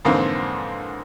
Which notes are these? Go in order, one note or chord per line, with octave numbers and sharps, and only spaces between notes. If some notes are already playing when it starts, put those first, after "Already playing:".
F2 G#2 D3 E3 A#3 C4